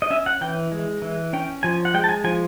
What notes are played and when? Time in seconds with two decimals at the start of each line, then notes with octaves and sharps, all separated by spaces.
0.02 D#5
0.10 C#4 E5
0.26 F#5
0.41 E3 G5
0.72 G#3
1.02 E3
1.33 C#4 G5
1.63 F3 G#5
1.85 F#5
1.94 G#3 G5
2.04 A5
2.09 G#5
2.24 F3 G#5